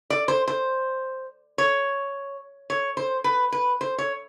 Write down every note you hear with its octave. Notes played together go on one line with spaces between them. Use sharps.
D5
C5
C5
C#5
C#5
C5
B4
B4
C5
C#5